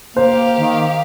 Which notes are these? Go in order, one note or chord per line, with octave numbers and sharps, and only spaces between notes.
A#3 G4 C5 F5
D#3